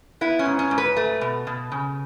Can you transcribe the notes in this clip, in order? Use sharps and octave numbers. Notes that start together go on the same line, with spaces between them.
B3 E4
C#4
G#2
C#4
G#2
B4
A3
B2
B2
C#3